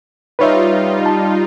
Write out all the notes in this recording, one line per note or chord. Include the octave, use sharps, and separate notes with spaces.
G3 D#4 F4 B4 C#5 E5
A5